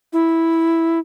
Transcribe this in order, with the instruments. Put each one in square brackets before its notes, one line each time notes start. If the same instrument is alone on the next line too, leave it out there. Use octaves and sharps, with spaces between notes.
[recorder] E4